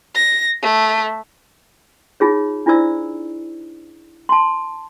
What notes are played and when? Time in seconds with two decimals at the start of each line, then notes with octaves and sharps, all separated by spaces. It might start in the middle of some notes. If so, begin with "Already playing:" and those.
0.15 A#6
0.62 A3
2.20 D#4 F4 G#4 C#5
2.66 D4 E4 F4 C5 D5 E6
4.29 A5 C6